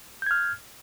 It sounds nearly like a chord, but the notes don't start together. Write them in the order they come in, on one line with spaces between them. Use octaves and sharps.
G6 G#6 F6